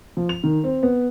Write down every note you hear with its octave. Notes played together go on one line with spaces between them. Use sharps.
F3
F7
D#3
C4
B3